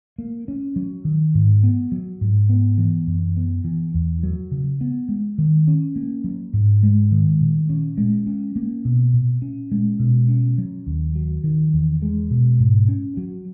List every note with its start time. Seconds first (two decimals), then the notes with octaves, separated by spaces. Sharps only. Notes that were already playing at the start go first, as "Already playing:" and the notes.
0.18 A#3
0.48 C#4
0.76 F#3
1.05 D#3
1.35 G#2
1.63 B3
1.92 F#3
2.21 G#2
2.49 B3
2.78 E3
3.07 F#2
3.37 B3
3.64 E3
3.94 E2
4.23 F#3
4.51 C#3
4.81 B3
5.09 G#3
5.38 D#3
5.68 C#4
5.96 A#3
6.24 F#3
6.53 G#2
6.83 G#3
7.12 D#3
7.41 A#2
7.69 C#4
7.98 G#3
8.27 C#4
8.56 A#3
8.85 B2
9.13 A#2
9.42 C#4
9.72 G#3
9.99 B2
10.29 C#4
10.58 F#3
10.86 D#2
11.15 F#3
11.44 D#3
11.73 E2
12.02 G#3
12.31 B2
12.60 G#2
12.88 C#4
13.17 F#3